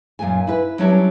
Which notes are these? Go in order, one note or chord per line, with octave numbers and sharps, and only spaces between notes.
F#2 A#2 G#5
E4 B4
F#3 G3 C#4 D4 E4 C#5